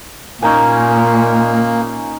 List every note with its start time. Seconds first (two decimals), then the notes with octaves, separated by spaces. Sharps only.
0.42 A#2 A#3 C#4 D#4 G#5